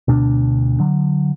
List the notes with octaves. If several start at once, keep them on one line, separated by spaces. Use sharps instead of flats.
D2 B2 D4
D3 F#3